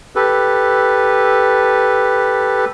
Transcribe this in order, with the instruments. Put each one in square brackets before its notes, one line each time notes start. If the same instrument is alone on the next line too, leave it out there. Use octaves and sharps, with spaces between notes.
[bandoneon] G4 A4 B4